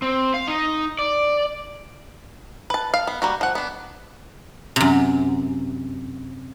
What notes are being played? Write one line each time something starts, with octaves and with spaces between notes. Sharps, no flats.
C4
F5
D#4
D5
B4 A5
F5
B3
G3 A#3 F#4
F3 F#5
B3 D4
F#2 C3